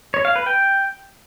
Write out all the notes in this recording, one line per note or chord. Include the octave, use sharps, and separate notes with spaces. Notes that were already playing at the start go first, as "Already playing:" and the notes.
C#5
F5
B4
G5